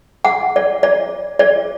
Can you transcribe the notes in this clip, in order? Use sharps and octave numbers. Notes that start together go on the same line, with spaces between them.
F#5
D5
D5
D5